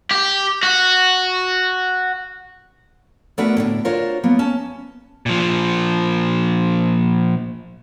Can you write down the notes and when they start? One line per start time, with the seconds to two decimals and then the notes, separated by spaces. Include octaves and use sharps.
0.11 G4
0.63 F#4
3.38 A3 B3 D4 F#4 A#4 B4
3.57 A2 D3 D4
3.85 D4 F4 F#4 A#4 C5 C#5
4.23 F#3 A#3 B3
4.39 C#4 A5
5.26 A#2 F3